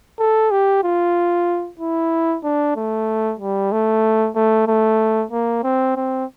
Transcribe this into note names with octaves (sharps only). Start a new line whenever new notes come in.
A4
G4
F4
E4
D4
A3
G3
A3
A3
A3
A#3
C4
C4